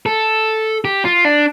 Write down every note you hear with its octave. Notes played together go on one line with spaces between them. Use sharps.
A4
G4
F4
D4